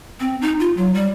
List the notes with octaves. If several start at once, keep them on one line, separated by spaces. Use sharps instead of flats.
C4
D#4
F4
F#3
G3